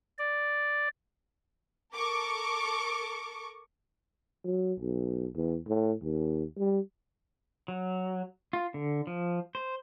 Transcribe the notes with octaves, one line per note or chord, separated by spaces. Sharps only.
D5
A4 A#4 C#6 D6
F#3
B1
E2
A2
D#2
G3
F#3
F4
D3
F3
C5